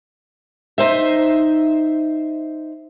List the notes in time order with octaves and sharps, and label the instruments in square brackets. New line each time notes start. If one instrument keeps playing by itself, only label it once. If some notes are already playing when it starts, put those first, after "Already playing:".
[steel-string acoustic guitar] D#4 C5 E5